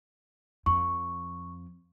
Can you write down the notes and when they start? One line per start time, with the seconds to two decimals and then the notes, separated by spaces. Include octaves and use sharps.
0.66 F2 C#6